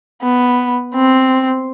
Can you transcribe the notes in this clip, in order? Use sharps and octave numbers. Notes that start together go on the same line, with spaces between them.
B3
C4